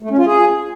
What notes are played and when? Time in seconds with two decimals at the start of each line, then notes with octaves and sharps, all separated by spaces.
0.03 A3
0.10 C#4
0.18 F4
0.26 G#4